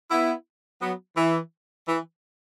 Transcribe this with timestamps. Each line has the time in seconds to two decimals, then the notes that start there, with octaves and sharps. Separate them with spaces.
0.11 B3 E4
0.81 F#3 B3
1.17 E3
1.88 E3